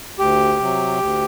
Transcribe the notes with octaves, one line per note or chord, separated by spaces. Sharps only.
D2 G4
C3 F#3
D2